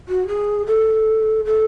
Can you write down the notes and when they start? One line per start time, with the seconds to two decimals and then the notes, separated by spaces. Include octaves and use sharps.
0.08 F#4
0.28 G#4
0.67 A4
1.45 A4